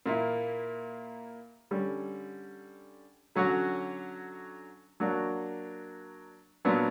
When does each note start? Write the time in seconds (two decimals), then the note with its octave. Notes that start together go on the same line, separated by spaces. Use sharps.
0.06 A#2 A#3 E4
1.71 D3 G3 C#4
3.36 D3 F#3 C#4 F#4
5.00 F#3 A#3 D4 F#4
6.65 A#2 F#3 B3 D4